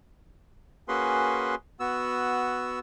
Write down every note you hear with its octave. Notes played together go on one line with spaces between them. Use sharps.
A#3 C#4 F#4 G#4 B4 C6
B3 F#4 E6